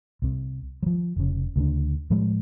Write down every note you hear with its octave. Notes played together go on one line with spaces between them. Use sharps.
C2 C3
F3 F#3
F1 C#3
D2 C#3 C4 D4
A2 F3 G3 G#3